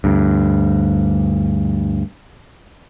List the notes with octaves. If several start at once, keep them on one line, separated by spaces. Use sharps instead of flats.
D2 G2